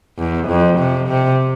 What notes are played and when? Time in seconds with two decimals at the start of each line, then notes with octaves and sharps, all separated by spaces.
0.19 E2
0.48 F2
0.79 C3
1.08 C3